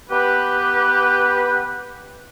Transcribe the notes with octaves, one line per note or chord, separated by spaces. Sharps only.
B3 G4 B4